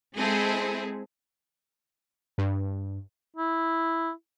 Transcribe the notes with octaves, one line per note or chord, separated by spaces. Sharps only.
G#3 C4 E4 G#4 A4
G2
E4